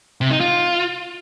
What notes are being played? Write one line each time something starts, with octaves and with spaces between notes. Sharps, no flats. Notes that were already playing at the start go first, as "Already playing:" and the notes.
C3
D#4
F4